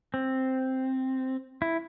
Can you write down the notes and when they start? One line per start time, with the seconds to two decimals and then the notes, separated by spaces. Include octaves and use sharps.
0.14 C4
1.62 E4